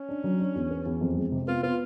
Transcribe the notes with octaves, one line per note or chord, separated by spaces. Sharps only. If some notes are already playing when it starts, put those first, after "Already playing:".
Already playing: C#4
D4
F#3
D4
E2
B3
E2
F2
G#3
C3
B3 F4
B3 F4